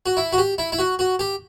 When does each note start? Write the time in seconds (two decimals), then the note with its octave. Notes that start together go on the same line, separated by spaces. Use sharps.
0.06 F#4
0.17 E4
0.33 F#4
0.38 G4
0.58 E4
0.72 E4
0.79 F#4
0.99 F#4
1.19 G4